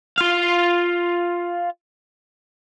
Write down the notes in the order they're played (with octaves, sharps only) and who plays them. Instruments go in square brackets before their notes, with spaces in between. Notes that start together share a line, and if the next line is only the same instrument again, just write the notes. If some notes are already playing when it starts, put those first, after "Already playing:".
[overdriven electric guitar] F4 F5